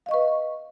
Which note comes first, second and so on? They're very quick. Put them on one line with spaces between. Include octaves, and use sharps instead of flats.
F5 D#5 C#6 B4